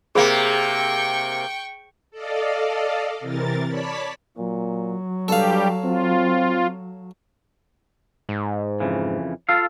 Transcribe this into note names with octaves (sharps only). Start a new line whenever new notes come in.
C3 A#3 G#4 C5 G5 B5 C#6
A4 D5 D#5 F5
C3 E3 A#4 A6
C#5 D5 A5 B5 B6
A#2 F#3
G2 G3 G4 A4 F5
C4 F4
G#2
F2 C#3 E3
F4 A4 F5